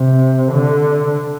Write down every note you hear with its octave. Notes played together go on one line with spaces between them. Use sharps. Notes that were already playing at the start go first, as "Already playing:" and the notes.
Already playing: C3
D3